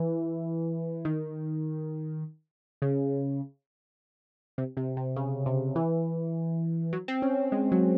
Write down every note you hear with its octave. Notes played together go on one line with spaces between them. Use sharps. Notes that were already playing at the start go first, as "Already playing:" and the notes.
Already playing: E3
D#3
C#3
C3
C3
C3
C#3
C3
E3
F#3
C4
C#4
G#3
F#3